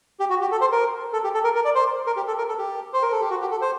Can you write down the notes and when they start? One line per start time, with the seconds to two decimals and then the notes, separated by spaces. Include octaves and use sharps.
0.20 G4
0.30 F#4
0.41 G4
0.52 A4
0.61 C5
0.72 A#4
1.13 A4
1.24 G4
1.34 A4
1.44 A#4
1.55 A#4
1.65 D5
1.75 C5
2.06 A#4
2.17 G4
2.27 A4
2.38 A#4
2.48 A4
2.58 G4
2.93 C5
3.02 A#4
3.12 A4
3.21 G4
3.30 F#4
3.41 G4
3.51 A4
3.62 C5